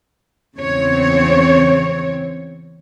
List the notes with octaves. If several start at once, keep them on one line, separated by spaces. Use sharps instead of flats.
E2 C#3 C4 C#5